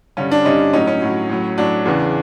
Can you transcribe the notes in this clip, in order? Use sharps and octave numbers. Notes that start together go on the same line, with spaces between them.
G2 D3 G3 C#4
D4
G2 D3 G3 C#4 D#4
A2 F#3 C#4 D#4
C#4
A2 F#3
A2 F#3
A2 F#3 D4
E2 C#3 E3